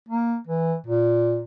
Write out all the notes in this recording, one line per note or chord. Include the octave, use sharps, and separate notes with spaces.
A#3
E3
A#2